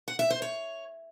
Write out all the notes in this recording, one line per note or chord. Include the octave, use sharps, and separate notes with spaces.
F#5
E5
C5
C#5